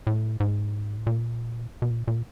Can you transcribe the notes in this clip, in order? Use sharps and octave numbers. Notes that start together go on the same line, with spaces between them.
A2
G#2
A2
A#2
B2
A#2
A#2